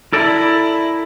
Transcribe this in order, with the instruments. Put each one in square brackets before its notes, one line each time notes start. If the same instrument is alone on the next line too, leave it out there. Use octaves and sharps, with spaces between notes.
[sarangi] E4 [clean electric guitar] A4 A#4 D5